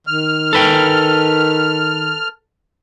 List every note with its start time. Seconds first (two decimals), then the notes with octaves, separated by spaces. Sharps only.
0.07 D#3 F6
0.53 A4 B4 G5